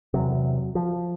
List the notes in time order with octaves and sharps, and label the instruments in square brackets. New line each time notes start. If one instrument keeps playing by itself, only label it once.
[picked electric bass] E2 C3 F#3
F3